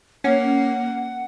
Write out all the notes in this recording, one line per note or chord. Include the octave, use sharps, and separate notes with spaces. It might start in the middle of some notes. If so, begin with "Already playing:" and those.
A#3 C#4 F#5